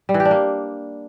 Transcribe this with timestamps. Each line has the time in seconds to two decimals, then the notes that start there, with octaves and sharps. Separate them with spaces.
0.09 G3
0.14 E3
0.20 G4
0.25 D4
0.31 A#3